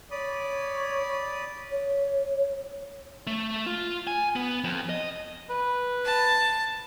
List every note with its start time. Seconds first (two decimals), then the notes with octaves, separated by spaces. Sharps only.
0.11 C#5 D5 B5 D#6
1.71 C#5
3.27 A3
3.66 F4
4.07 G#5
4.36 B3
4.64 F2
4.89 D#5
5.50 B4
6.05 A5